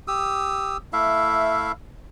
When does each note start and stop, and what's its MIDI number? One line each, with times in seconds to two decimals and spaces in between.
0.08 0.77 67
0.08 0.77 87
0.08 0.77 88
0.93 1.72 57
0.93 1.72 64
0.93 1.72 76
0.93 1.72 77